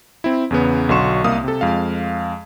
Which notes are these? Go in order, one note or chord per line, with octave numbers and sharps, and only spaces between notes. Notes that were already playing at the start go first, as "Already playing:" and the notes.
C4 E4
E2 C#3 B3
B1 D3 F#4 C6 C#6 E7
C2 A#3 F5 D#6
C3 A4
F2 G#3 F5